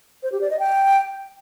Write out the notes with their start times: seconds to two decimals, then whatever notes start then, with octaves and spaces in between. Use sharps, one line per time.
0.23 C5
0.32 G4
0.41 D5
0.50 D#5
0.59 G5